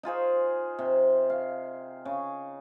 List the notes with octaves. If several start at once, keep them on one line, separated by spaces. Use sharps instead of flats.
D#4 F4 G#4 C5
C3
F5
C#3